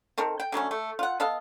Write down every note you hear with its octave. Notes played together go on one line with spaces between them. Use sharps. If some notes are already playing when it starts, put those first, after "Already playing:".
D#3 C4 A4 A#4
G5
D3 F#3 A3 C#4
A3
F4 F#5
B3 A4 D#5 F5